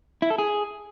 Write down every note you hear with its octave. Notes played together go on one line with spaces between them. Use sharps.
E4
A4
G#4